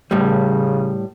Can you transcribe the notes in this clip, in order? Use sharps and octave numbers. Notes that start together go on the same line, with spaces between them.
A2 C#3 G3